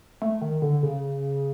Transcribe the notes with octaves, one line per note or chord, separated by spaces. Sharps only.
A3
D#3
D3
C#3